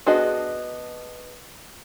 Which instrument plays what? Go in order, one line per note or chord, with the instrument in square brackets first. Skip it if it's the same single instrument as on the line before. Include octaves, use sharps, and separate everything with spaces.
[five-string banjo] B3 D4 F#4 G#4 D#5